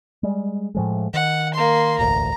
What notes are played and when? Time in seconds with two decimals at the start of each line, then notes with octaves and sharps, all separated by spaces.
0.23 G3 G#3
0.75 A2 F3 G#3
1.14 D#3 F#5
1.54 A#3 C6
1.99 E1 A1 D2 A#5